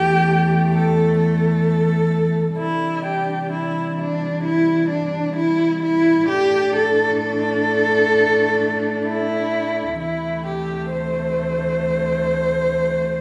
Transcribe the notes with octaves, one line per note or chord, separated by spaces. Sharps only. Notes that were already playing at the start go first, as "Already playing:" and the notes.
Already playing: E2 E3 A3 G4
A4
A4
C3 E3 G3 D4 E4
G4
E4
D4
E4
D4
E4
E4
A2 A3 D4 G4
A4
A4
E4
D2 C3 E3 A3 E4
G4
C5